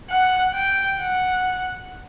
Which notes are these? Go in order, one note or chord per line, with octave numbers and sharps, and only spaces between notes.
F#5
G5
F#5